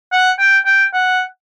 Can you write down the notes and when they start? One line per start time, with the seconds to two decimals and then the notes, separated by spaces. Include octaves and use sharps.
0.12 F#5
0.39 G5
0.66 G5
0.94 F#5